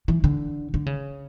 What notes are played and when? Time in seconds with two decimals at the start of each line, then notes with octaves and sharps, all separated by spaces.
0.08 E3
0.24 D3
0.74 D3
0.86 C#3